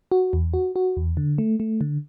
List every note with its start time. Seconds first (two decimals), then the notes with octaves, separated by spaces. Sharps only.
0.12 F#4
0.33 E2
0.54 F#4
0.76 F#4
0.97 E2
1.17 D3
1.38 A3
1.60 A3
1.81 D3